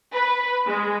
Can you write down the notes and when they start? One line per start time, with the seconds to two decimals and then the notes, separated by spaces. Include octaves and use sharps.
0.14 B4
0.69 G#3